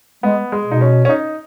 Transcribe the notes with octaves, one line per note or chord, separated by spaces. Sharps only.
G#3 B3
G#3
B2 D#4
C#4
C#4
D#4